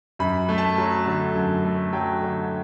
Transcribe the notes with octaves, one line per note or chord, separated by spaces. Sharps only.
F#2 B5
A3
A5
F#3
D3
F#2
A3
F#3 G5
D3